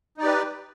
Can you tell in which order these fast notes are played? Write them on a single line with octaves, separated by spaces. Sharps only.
D#4 D5 G4 B4